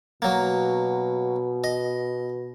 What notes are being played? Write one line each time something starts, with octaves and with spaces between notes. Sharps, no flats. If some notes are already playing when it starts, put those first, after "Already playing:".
B2 F#3 A#3
D#5